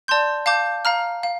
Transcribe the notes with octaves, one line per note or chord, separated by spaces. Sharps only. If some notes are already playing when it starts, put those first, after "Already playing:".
D5 A5 C6 G6
F5 A5 D6 G6
F5 A#5 F6
F5